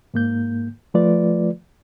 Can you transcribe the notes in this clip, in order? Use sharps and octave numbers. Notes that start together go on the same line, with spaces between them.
G#2 A#3 G6
F3 A3 F4 B4 D5